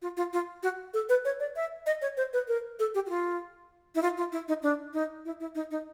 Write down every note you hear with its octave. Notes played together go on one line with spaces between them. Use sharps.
F4
F4
F4
F#4
A4
B4
C#5
D5
E5
D#5
C#5
C5
B4
A#4
A4
G4
F#4
F4
E4
F4
F4
E4
D#4
D4
D#4
E4
E4
D#4
D#4